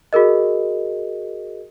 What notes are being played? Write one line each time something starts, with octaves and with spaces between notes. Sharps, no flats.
F#4 G#4 A#4 D#5